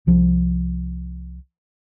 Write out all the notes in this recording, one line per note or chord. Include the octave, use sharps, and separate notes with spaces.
C2 F3